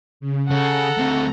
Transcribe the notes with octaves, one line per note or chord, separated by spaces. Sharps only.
C#3
C#3 A4 F#5 A#5
D2 C4